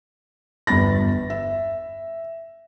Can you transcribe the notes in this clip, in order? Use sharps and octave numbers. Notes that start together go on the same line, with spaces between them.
G1 E2 G3 B5 A6 A#6
E5